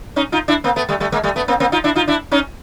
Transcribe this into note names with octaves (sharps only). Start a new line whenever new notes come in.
C#4 D#4
D#4 F4
D4 E4
A#3 C4
A3 B3
G3 A3
G3 A3
G#3 A#3
G3 A3
A3 B3
A#3 C4
A#3 C4
D#4 F4
D4 E4
D#4 F4
D4 E4
C#4 D#4